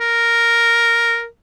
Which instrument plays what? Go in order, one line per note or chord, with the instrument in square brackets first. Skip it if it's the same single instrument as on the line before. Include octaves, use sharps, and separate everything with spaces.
[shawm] A#4